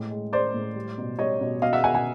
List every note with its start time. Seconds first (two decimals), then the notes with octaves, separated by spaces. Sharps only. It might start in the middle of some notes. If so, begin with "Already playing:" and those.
Already playing: A2 G#3
0.10 G#3
0.32 G#3 C5 D5
0.54 A2
0.75 G3
0.98 B2
1.19 G3 C#5 D#5
1.41 B2
1.62 B2 D#5 F5
1.73 E5 F#5
1.84 B2 F#5 G#5
1.95 F#5 G#5